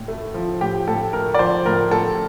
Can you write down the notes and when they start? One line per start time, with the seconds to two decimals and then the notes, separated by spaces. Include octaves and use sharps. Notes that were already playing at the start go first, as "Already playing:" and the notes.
Already playing: A2
0.08 A3
0.34 F3
0.61 A2 G4
0.88 A2 A4
1.13 A3 A#4
1.34 D5
1.39 F3 C5
1.66 A2 A#4
1.91 A2 A4